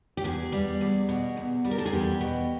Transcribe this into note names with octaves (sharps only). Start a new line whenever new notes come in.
G4
E2 G#4
G3
E2
B2
E2
G3
A#4
A4
G#4
E2 G4
B2